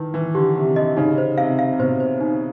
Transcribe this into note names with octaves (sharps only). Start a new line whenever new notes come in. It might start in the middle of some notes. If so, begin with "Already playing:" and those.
Already playing: D#3 E4 B4
E3 B4
D3 G4
C3 G4
D3 D#5
C#3 D#4
C5
C3 F5
F5
C3
B2 C5
C5
D#4